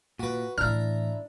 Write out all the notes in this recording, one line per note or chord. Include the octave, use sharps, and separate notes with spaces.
A#2 F#4 B4
A2 E3 D4 E4 A#5 F6